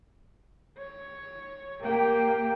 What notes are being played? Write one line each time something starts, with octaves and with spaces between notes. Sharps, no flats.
C#5
A#3 G4 G5